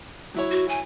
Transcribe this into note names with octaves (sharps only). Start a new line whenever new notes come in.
F#3 E4 C#5
F#4
G#5